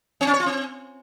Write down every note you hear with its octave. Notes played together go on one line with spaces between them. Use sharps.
C4
C#4
C#5
F4
C4